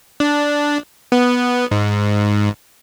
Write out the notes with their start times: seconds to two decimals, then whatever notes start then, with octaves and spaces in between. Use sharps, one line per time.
0.20 D4
1.12 B3
1.71 G#2